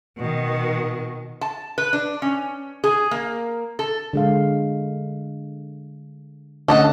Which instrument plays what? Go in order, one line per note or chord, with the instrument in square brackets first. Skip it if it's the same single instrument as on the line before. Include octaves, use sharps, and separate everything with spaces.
[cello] B2 D#3
[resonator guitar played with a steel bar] A5
B4
D4
C#4
G#4
A#3
A4
[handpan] D3 G#3 F5
[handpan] D3 A3 C#4 [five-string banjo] A4 D#5 F#5